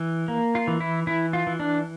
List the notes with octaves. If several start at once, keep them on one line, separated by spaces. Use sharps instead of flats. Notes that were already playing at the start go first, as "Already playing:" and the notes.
Already playing: E3
A#3
F4
E3
E4
E3 E4
F4
E3
D4